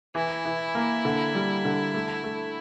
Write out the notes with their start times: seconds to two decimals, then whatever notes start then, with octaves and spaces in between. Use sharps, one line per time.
0.15 E3 E4
0.45 E3
0.75 A#3
1.05 D3
1.35 G3
1.65 D3
1.94 A3
2.24 A3